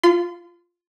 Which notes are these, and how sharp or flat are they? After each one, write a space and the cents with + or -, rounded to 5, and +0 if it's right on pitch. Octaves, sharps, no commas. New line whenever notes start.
F4 +0 C6 -35